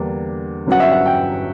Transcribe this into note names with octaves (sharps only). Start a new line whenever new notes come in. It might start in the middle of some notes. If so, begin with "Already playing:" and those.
Already playing: E2 D3 G3 A#3 D4
G1 G2 F#3 C#4 F#5
E5
F#5
G5